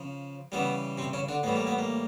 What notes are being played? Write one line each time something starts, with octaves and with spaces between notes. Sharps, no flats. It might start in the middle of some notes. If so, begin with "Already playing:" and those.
Already playing: C#3 F3
C#3 E3 G3 B3
C3 C4
C#3 C#4
D3 D4
A2 E3 G3 B3
A#3
B3
A#3